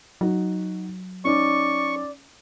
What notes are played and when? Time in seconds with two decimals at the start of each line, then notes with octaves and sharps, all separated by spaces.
0.21 F#3 D#4 F#4
1.25 C#4 D#4 D5 C#6